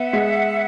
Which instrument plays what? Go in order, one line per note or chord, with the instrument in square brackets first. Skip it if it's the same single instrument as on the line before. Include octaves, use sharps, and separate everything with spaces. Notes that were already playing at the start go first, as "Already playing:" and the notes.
Already playing: [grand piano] B3 [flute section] E5 F#5
[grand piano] G#3